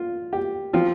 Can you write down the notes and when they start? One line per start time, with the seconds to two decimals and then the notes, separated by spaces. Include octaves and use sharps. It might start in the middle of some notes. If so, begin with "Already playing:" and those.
Already playing: F4
0.33 G4
0.73 F3 C4 F4